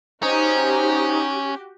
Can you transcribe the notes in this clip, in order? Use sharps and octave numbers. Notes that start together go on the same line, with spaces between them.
C#4 D#4 F#4 G4 C5